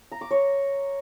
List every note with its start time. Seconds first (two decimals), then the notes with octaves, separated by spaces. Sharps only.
0.12 A#5
0.21 D6
0.31 C#5